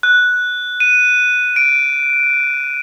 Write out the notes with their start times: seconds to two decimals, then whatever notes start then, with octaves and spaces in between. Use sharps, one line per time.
0.03 F#6
0.80 D#7
1.56 D7